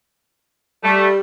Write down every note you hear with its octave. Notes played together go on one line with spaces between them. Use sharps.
G3 A3